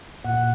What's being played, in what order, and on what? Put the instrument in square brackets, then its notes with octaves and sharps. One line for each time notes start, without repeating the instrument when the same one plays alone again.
[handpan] A#2 F#5